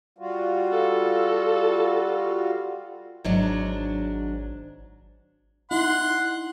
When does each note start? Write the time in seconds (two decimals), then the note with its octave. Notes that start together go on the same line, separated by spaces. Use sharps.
0.18 G3 F4 F#4
0.72 A4
3.24 G#1 G#2 F#3 D4
5.71 D#4 E4 F#5 C6